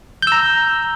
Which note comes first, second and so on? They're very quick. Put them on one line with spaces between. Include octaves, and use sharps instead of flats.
G6 E6 A#5